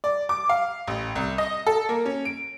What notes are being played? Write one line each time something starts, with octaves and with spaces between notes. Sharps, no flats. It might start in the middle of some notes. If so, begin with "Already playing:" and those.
D5
D6
F5
A1
C2
D#5
A4
A#3
C#4
D7